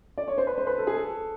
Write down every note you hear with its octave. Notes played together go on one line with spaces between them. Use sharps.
D5
C#5
C5
B4
C5
B4
A4
G#4
A4